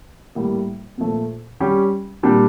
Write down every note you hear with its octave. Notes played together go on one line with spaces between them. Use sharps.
A2 G3 A#3
A#2 F3 A3
G3 C#4 G4
A#2 G3 D4 G4